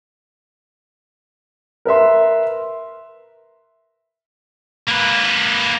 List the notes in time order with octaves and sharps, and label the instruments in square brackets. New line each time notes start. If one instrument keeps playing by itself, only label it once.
[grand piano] A#4 B4 E5 C6
[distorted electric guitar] A#3 B4